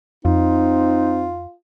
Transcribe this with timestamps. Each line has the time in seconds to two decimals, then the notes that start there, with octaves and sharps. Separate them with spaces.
0.25 F2 C4 D#4 F4